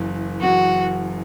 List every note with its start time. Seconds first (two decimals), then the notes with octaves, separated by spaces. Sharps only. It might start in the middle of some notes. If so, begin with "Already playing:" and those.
Already playing: F#1 F#2 E3
0.41 F#1 F#2 E3 F#4